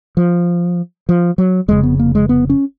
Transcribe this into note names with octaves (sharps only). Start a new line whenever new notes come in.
F3
F3
F#3
F1 F2 C#3 G#3
B3
A#3
G#3
B3
C#4